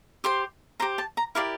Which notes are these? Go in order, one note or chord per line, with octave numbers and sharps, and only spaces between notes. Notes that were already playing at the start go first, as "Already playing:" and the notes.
G4 C5 C6
G4 C5 A#5
A5
A#5
E4 G4 A#4 D5 F5